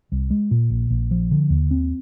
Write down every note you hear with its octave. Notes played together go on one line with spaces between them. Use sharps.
C2
G#3
A#2
A#1
A#1
F3
D3
D#2
C4